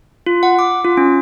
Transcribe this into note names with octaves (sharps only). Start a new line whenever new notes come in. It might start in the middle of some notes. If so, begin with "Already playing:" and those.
F4
F#5
D6
F4
C#4